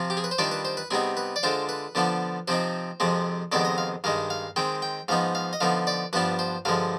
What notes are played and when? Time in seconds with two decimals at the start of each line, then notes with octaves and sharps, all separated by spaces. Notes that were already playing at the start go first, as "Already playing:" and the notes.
Already playing: C3 F3 C4 F4
0.10 G4
0.17 G#4
0.24 B4
0.31 C5
0.38 D#3 G3 D4 F4 D5
0.51 B4
0.65 C5
0.77 B4
0.91 C3 G3 B3 D#4 G#4
1.17 B4
1.36 D5
1.43 D3 G#3 D4 F4 C5
1.69 B4
1.95 D3 F3 B3 D4 F4
2.48 C3 F3 C4 D#4 C5
3.00 F2 C3 F3 G#3 C4
3.52 F2 C3 D#3 G#3 B3 D5
3.65 D#5
3.78 F5
4.04 G2 D#3 G#3 F5
4.30 F5
4.56 D#3 G#3 C4 G5
4.82 G5
5.08 G#2 F3 B3 D#4 F5
5.35 F5
5.53 D#5
5.60 D3 F3 B3 D#4 F5
5.87 D5
6.13 G2 F3 B3 D4 F4 B4
6.39 C5
6.65 G2 D3 F3 G#3 F5